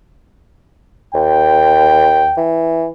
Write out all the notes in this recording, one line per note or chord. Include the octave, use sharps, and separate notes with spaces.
D#2 G5
E3